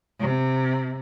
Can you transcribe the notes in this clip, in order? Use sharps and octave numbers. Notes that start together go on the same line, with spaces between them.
C3